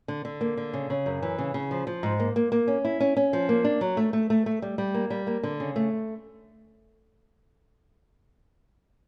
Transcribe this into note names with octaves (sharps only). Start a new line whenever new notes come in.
D3
D3
A#3
D3
C#3
C#3
F#2
E3
C#3
C#3
F3
F3
G#2
A#3
A#3
A#3
C#4
E4
C#4
C#4
F3
A#3
D4
F#3
A3
A3
A3
A3
G3
G3
A#3
G3
A#3
D3
C#3
A3